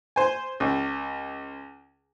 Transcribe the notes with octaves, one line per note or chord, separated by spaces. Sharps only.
C5 G#5
C#2